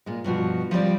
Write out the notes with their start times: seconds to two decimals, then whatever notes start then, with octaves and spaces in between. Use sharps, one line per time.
0.06 A#2 G#3
0.24 G2 B2 F3 F#4
0.71 F3 G3 C4 D5